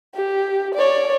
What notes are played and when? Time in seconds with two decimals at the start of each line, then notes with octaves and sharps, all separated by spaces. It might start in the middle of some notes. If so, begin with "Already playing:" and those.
0.15 G4
0.74 C#5 D5